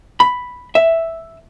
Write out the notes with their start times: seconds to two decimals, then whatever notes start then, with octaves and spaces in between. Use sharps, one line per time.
0.20 B5
0.75 E5